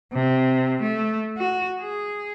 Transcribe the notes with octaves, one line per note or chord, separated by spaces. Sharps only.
C3
A3
F#4
G#4